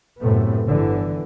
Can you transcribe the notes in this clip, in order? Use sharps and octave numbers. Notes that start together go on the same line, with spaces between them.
F#2 A2 C3 A3 B3
G1 D3 E3